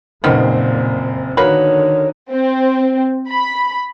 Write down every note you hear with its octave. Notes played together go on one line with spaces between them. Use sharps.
F#1 F2 A#2 D#3 B3 C4
D3 D#3 A#3 F#4 B4 C#5
C4
B5